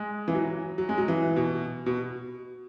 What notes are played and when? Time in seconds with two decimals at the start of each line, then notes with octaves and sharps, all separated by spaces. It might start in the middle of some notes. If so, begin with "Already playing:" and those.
Already playing: G#3
0.28 E3
0.35 F#3
0.78 F#3
0.89 G#3
0.98 F#3
1.08 E3
1.36 B2
1.86 B2